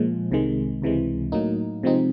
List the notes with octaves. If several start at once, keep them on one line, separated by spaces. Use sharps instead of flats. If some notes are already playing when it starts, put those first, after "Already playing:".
Already playing: A#2 F3 G#3
C2 C3 D#3 G#3
C#2 C3 E3 G#3
A2 F#3 A#3 D#4
C3 F3 G#3 C4 D#4